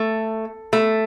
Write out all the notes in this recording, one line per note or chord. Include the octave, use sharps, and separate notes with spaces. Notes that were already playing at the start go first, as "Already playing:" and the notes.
Already playing: A3
A3